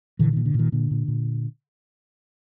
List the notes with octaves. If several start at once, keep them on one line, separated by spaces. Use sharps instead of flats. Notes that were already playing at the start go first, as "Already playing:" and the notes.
A#2 D3 E3
A#2 D#3
D3
A#2 D#3
A#2 D3
A#2
A#2